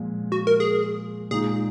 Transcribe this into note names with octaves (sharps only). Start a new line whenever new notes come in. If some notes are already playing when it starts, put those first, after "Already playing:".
Already playing: A#2 F3 G#3
F#4
A#4
G#4
A#2 G#3 D#4 G#4